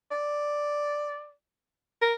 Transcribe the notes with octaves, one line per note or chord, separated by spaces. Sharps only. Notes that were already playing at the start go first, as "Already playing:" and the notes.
D5
A#4